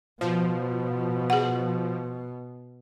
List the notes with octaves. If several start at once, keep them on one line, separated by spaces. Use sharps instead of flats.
B2 F3
G#4 F#5